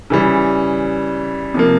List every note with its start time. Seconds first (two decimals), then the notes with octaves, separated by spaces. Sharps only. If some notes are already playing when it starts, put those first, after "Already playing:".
0.10 C#3 E3 G3
1.54 C3 F3 A#3